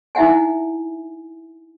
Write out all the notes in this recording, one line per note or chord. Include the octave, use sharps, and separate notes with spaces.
D#4 E4 E5 F#5 G#5